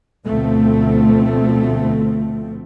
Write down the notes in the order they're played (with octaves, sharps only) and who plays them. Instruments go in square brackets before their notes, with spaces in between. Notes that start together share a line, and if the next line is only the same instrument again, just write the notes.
[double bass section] D2 B2 F3 A3 C4